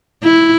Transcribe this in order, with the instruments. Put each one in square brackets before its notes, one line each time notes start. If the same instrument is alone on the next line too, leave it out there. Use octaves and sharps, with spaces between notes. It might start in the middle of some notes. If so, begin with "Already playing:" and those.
[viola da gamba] E4